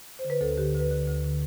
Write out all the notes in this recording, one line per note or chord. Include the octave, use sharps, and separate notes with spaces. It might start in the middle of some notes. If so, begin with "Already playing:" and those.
C5
D3
B4
D2 A4
D3 G4
D2 B4
D3
D2
D3